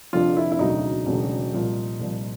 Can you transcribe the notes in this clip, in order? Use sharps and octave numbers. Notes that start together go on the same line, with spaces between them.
F1 F2 D3 F3 F4
E4
E4
E1 D2 C#3 F#3 D#4
E1 D2 C#3 F#3
C2 A#2 F3
C2 A#2 F3